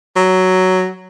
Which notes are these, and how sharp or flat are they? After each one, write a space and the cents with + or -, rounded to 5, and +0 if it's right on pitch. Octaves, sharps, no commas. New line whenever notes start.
F#3 +5